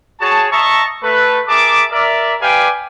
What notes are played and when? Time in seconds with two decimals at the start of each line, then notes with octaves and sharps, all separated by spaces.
0.21 F#4 G#4 C#5 A5
0.52 D#5 E5 A5 A#5 C#6
1.03 A3 B4
1.48 G#4 A#4 E5 A5 D6
1.91 A#4 D5 E5
2.41 G4 B4 D5 F5 G5 G#5